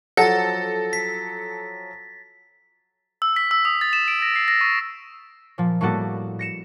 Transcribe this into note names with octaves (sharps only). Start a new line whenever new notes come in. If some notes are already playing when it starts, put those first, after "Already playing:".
F3 F#3 A4 F#5 A6 A#6
B6
E6
B6
E6
D#6
A6
E7
D7
A#6
C7
A#6
C#6
A#2 F3
A2 G3 A#3 B3 F#4 A4
A#6 C#7 E7